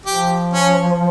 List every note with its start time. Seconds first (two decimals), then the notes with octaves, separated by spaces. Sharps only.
0.06 F3 G4
0.53 C#4